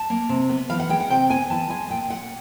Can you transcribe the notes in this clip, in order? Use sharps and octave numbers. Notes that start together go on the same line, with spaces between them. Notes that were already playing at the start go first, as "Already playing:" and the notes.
Already playing: A5
A#3
C3
B3
E3 F5
F#5
G#3 G5
F#5
C3 G5
B3 G#5
E3 A5
G#3 G#5
A#2 G5
A#2 F#5